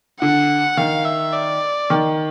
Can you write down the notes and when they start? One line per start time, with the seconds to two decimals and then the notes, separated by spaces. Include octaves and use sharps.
0.21 D3 F#5
0.77 D#3 F5
1.05 E5
1.33 D5
1.90 D#3